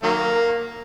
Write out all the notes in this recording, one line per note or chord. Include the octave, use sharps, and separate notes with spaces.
D#3 F#3 A#3